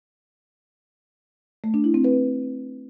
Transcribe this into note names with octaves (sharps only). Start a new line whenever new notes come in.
A3
D4
E4
C4
B4